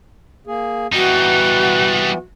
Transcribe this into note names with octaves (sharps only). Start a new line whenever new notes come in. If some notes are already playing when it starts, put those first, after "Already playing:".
A#3 G#4
E3 G3 B3 D#4 F#4